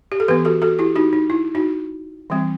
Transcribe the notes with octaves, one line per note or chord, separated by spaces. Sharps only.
G4
A4
E3 B3 G4 B4
F#4 A4
F#4 A4
E4 G4
D#4 F#4
D#4
E4
D#4 F#4
E3 G3 C4